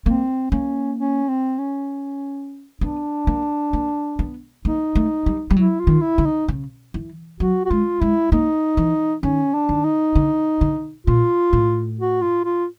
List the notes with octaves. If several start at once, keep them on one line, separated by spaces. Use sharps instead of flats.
A#3 C4
A#3 C#4
C#4
C4
C#4
B3 D4
A#3
A#3
B3
A#3 D#4
A3
G3
G3
F#3 E4
F4
D#3
E4
D3
D#4
C#3
E3
F#3 F#4
F#4
G#3 F4
G#3 E4
A#3 D#4
E3
D#3 C#4
D4
D#3
D#4
D3
D3
A#2 F4
A2
F#4
F4
F4